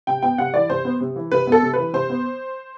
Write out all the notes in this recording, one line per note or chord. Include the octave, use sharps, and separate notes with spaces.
C3 G5
B3 G5
C3 F#5
E3 D5
C3 C5
B3
C3
E3
C3 B4
B3 A4
C3
E3 B4
C3 C5
B3